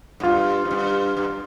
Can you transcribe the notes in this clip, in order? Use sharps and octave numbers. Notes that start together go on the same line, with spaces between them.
G#2
G2 F4
G#2
G2
G2